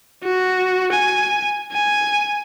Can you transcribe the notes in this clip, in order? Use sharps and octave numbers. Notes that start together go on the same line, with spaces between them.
F#4
G#5
G#5